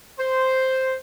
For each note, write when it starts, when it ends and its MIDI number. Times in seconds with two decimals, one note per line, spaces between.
0.19 0.95 72